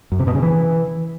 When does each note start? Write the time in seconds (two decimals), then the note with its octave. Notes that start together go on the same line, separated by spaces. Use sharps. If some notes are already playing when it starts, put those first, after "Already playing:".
0.12 F#2
0.19 C3
0.27 B2
0.35 C#3
0.42 E3